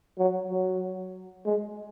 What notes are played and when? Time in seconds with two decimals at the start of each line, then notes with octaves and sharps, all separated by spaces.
0.19 F#3
0.51 F#3
1.45 G#3